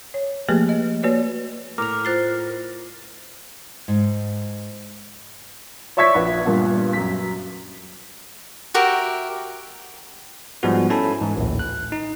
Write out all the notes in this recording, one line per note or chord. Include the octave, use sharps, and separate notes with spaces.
C#5
F3 A3 A#3 G4 G#4 B4
D#5
A#3 F#4 B4 C#5 D5
A2 A#4 D6 F7
F4 C5 F#6 A6 C7
G#2
C#5 D5 E5 C#6 G#6 B6
A#1 B4
G2 A#2 B3
F#2 B6
F#4 G4 A#4 E5
G#2 F3 G3 G#3 B3 F#4
C#4 E4 A4 G#5 A5 B5
G#2 E3
A#1 D#2 A2
F#6
D#4